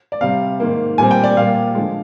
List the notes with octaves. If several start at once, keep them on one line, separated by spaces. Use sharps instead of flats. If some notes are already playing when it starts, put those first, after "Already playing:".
D5
C3 G3 C4 F5
G#2 D#3 A#3
A#2 G3 C4 G#5
G5
D5
A#2 G3 A#3 F5
D3 F3 G#3